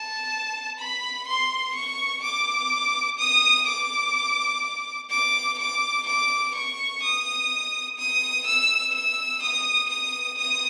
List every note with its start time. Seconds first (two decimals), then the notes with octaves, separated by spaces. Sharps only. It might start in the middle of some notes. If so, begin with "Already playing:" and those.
Already playing: A5
0.79 B5
1.27 C6
1.74 C#6
2.23 D6
3.18 D#6
3.67 D6
5.10 D6
5.58 D6
6.06 D6
6.55 C#6
7.02 D#6
7.98 D#6
8.46 E6
8.94 E6
9.42 D#6
9.89 D#6
10.38 D#6